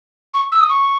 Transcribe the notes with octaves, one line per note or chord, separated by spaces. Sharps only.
C#6
E6
D#6
C#6